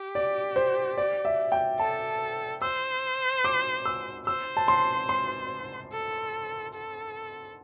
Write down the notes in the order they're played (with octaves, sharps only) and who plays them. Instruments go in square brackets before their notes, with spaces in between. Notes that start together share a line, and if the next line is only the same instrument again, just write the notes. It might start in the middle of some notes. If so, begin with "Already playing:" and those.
Already playing: [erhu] G4
[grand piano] D5
C5
D5
E5
G5
[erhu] A4 [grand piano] A5
[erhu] C5 [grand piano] E6
[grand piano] D6
E6
[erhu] C5 [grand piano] E6
[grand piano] A5
C6
C6
[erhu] A4
A4